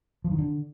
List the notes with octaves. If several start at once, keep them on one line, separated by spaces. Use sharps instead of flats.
F3
D#3
D3